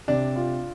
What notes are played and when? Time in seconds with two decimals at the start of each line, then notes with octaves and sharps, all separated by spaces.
0.08 C3 D4
0.36 F4